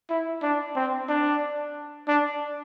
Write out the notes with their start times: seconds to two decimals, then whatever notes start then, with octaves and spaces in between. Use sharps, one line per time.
0.10 E4
0.43 D4
0.76 C4
1.09 D4
2.08 D4